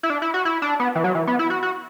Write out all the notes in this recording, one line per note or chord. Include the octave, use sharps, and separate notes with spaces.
E4
D4
E4
F#4
E4
D4
B3
E3
F#3
E3
B3
E4
F#4
F#4